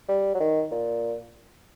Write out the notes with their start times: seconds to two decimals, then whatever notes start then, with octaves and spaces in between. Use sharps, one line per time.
0.08 G3
0.35 F#3
0.40 D#3
0.71 A#2